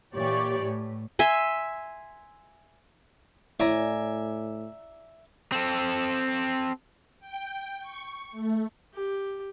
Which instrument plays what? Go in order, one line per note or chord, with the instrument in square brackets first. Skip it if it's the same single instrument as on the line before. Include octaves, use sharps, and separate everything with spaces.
[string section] A#2 E3 G4 C#5 D5 C#6
A2
[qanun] E5 G#5 C6
[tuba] A2 [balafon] E4 C#5 [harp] D5 G#5 A#5 [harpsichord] E5
[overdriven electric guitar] C4 A4
[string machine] G5
C#6
A3
[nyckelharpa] G4